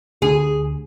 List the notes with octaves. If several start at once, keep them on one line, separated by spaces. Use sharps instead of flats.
D2 G#4